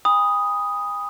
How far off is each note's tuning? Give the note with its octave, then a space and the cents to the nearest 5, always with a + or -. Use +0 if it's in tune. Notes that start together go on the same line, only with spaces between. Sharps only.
G#5 -45 B5 +0 D#6 +0